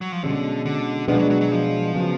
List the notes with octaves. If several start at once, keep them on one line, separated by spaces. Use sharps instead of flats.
F#3
F3
B2 D3 G#3 C#4
D3
B2 F3 G#3 B3 D4
F#3
F#3
F#3
F3
C#3 F#3 B3